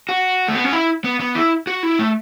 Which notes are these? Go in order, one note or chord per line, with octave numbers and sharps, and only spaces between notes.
F#4
A3
B3
C#4
E4
B3
B3
E4
F#4
E4
A3